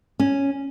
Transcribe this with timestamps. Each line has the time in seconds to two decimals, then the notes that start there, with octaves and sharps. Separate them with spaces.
0.20 C#4